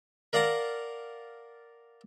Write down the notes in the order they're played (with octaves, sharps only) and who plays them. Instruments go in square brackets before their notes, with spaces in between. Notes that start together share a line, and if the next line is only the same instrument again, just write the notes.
[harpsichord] A#4 D5 F5 F#5 A5 A#5